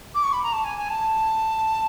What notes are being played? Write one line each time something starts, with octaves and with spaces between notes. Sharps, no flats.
D6
C#6
B5
A#5
A5
G#5
G#5
A5